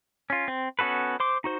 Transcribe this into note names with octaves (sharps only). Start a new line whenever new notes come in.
C#4 F4
C4
B3 C#4 F#4 A4 B4
C5 C6 D6
D#4 F#4 C5